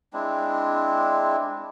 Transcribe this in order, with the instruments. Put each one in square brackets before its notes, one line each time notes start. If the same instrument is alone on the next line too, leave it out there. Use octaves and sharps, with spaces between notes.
[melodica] G#3 C4 D4 E4